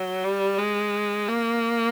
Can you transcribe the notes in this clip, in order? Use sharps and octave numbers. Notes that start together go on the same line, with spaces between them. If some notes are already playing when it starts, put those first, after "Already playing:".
Already playing: F#3
G3
G#3
A#3